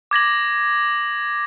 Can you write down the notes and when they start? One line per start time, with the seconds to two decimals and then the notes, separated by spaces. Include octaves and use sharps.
0.11 D6 G#6 A#6 F#7